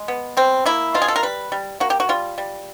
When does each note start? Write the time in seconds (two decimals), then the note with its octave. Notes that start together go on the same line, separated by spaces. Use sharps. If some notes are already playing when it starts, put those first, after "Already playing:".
Already playing: G#3
0.08 B3
0.37 G3 C4
0.66 A#3 E4
0.94 B2 F4
1.02 G#4
1.08 A4
1.16 A#4
1.23 G3 B4
1.52 G3
1.80 A#3 F#4
1.90 G4
2.00 F#4
2.09 G3 F4
2.38 G3